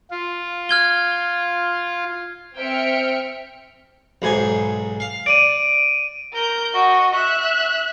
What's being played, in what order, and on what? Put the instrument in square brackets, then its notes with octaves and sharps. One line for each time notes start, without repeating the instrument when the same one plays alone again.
[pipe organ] F4
[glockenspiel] F6 G#6 G7
[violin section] C4 E5 G5 F6 C#7 D7
[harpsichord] B1 G#2 G#5
F5
[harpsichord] D5 [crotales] D7 D#7
[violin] A#4 G6
F#4 D#5
E5 F#6